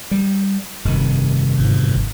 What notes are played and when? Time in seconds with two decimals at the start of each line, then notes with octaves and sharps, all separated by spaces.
0.11 G3
0.85 F1 G2 D#3
1.59 G1 G#2